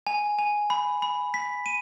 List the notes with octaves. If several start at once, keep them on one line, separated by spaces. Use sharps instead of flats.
G#5
G#5
B5
B5
B6
D#7